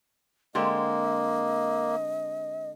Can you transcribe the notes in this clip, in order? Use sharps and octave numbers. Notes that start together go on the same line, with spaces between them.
D3 G#3 A#3 C4 D#5